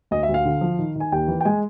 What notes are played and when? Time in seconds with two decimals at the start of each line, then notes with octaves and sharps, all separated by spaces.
0.11 D2 D#5
0.23 E5
0.29 D2
0.34 F5
0.45 D3
0.61 F3
0.79 D#3
0.96 D#3 G#5
1.12 D#2 G5
1.28 E3
1.41 G5
1.45 G#3 G#5